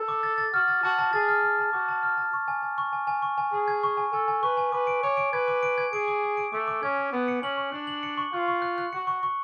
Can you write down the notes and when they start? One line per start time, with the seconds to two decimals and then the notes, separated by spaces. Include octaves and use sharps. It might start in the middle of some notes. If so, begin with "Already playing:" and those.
Already playing: A4
0.08 D6
0.23 A6
0.38 A6
0.53 F#4 F6
0.68 A6
0.83 F#4 A5
0.99 A5
1.13 G#4 A6
1.28 F6
1.43 F6
1.58 A5
1.73 F#4 D6
1.89 A5
2.03 F6
2.17 A5
2.33 C#6
2.48 G#5
2.62 G#5
2.78 C#6
2.93 G#5
3.07 G#5
3.22 C#6
3.38 G#5
3.52 G#4 G#5
3.68 G#6
3.83 C#6
3.97 G#5
4.12 A4 G#5
4.28 G#5
4.43 B4 C#6
4.57 G#5
4.72 B4 D6
4.87 D7
5.02 C#5 D6
5.17 D7
5.33 B4 G#6
5.48 D6
5.63 D7
5.78 G#6
5.93 G#4 D7
6.08 D6
6.23 D6
6.37 D7
6.53 A3 D6
6.68 D6
6.83 C#4 G#6
6.97 G#6
7.13 B3 F#6
7.28 C#7
7.42 C#4 F#7
7.57 C#6
7.72 D4 F#6
7.87 F#7
8.03 C#7
8.17 C#6
8.33 F4 F#6
8.48 C#6
8.62 F#6
8.78 F#6
8.93 F#4 C#7
9.07 C#6
9.23 C#6